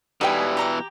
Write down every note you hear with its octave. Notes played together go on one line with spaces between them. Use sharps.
B2 E3 G3 D#4 A4 B4 G5 G#5
G4 A#5 D6